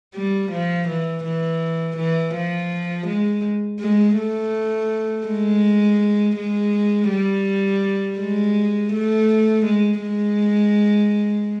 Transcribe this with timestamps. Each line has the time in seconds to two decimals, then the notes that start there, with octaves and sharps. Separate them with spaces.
0.15 G3
0.52 F3
0.88 E3
1.25 E3
1.97 E3
2.35 F3
3.07 G#3
3.81 G#3
4.17 A3
5.27 G#3
6.37 G#3
7.10 G3
8.19 G#3
8.93 A3
9.66 G#3
10.02 G#3